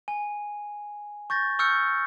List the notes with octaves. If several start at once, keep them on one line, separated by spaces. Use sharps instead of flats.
G#5
C#6 G6 A6 A#6
C#6 E6 F6 G6 C#7